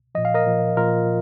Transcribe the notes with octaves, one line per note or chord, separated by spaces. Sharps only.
A#2 F3 D#5
F5
A#4 D#5
A#2 F3
A#2 F3 F4 A#4